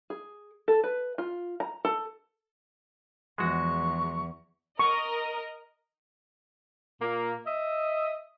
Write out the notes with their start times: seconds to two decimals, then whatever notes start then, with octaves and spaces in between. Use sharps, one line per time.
0.10 G#4
0.68 A4
0.83 B4
1.18 F4
1.60 A#5
1.85 A4
3.38 E2 F3 G#3 F#4 C#6
4.79 A#4 D#5 C#6
7.00 A#2 A#3
7.46 D#5 E5